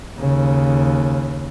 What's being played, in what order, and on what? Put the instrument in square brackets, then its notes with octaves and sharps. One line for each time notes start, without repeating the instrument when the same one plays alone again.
[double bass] D#2 C#3